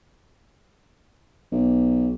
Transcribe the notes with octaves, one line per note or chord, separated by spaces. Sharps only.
B1